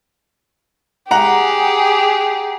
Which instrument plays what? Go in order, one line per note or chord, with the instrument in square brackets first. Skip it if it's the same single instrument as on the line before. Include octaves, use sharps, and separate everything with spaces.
[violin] G4 G#4 [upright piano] F#5 A#5